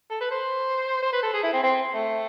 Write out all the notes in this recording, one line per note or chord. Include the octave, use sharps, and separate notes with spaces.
A4
B4
C5
C5
B4
A4
G#4
E4
C4
C4
A3